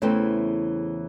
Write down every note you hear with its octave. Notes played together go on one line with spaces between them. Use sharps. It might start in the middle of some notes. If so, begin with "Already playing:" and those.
E2 C#3 E3 A3 C4